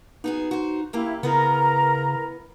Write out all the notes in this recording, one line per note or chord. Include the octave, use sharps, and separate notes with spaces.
B3 D#4 F#4 G#4
F#4 C5
C#3 A#3 E4 G4
C#3 B3 E4 A#4 B4 A#5